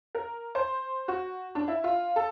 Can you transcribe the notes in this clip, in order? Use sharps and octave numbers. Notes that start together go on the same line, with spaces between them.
A#4
C5
F#4
D4
E4
F4
A4